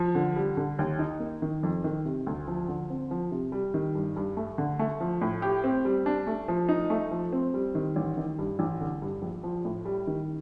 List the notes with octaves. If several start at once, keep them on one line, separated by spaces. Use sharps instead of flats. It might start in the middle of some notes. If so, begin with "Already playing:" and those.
Already playing: F3
D3
G3
D3
D#2
D#4
A#3
D#3
F2
D#3
C3
D2
F3
D3
C4
F3
C3
G3
D#3
G2
G2
A3
D3
A3
F3
A2
G4
C4
G3
D4
A3
F3
D#4
A3
F3
C4
G3
D#3
A1
D#3
G2
A1
D3
G2
A#1
F3
A2
G3
D#3